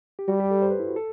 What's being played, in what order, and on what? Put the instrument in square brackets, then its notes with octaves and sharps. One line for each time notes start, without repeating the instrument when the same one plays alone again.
[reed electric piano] G4
[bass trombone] G3 [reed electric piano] F#4
[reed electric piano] G4
A4
C5
B4
E4
F#4
A4